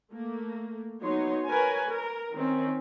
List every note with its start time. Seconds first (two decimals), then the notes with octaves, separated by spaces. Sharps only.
0.12 A3 A#3
1.02 F#3 B3 D#4 C#5 C6
1.46 A#4 B4 C#5 G#5
1.89 A#4
2.34 D#3 C4 C#4